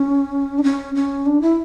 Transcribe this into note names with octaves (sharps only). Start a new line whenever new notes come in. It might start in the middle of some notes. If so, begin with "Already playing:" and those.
Already playing: C#4
D4
C#4
C#4
D4
E4